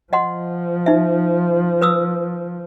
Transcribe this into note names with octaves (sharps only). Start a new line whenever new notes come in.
F3 D#5 F#5 C6
D#4 E5
B4 D#6 E6